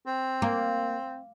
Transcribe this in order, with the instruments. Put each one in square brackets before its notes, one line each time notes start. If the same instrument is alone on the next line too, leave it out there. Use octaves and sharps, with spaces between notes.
[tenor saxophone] C4
[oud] A#3